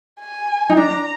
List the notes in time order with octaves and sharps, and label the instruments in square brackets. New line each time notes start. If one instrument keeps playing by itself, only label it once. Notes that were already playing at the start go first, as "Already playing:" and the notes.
[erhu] G#5
[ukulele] D#4
[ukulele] D4 [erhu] A#5
[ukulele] D4